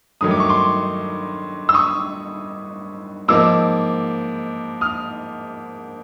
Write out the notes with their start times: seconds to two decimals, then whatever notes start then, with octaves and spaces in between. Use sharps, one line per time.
0.21 G2 D#3 F#3 A3 D#6
0.31 D6
0.40 C#6
0.49 C6 D6
1.69 E6
1.74 C#6 D#6
3.28 G#2 F3 A#3 D#4 D6 E6
4.81 D#6 F6